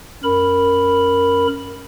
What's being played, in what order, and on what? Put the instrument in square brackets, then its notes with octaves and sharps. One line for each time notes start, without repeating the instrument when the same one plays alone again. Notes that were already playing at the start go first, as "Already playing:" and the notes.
[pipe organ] F#2 A#4 B5